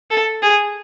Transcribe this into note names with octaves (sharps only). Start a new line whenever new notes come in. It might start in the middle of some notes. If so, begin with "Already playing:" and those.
A4
G#4